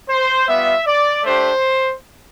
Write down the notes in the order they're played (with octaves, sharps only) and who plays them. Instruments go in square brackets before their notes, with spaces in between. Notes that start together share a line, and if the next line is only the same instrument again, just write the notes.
[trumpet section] C5
G3 B3 F4 E5
D5
A3 D4 G4 C5